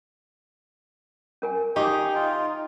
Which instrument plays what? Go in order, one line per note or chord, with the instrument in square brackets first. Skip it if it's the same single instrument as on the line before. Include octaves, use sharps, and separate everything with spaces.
[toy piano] C#4 A#4 G#5
[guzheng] D#4 [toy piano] G4 F5 D6 [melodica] G#4 [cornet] G5
[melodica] F4